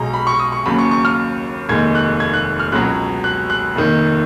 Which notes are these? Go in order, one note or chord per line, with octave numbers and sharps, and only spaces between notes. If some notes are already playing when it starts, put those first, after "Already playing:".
Already playing: B1 B2 G#3 A#5
B5
C#6
D#6
C#6
D#2 C#3 F#3 B5
C#6
C#6
F6
F1 D#2 D#3 G#3 G#6
F#6
G#6
F#6
F6
C#2 B2 F#3 F#6
F#6
F#6
F1 D#2 D#3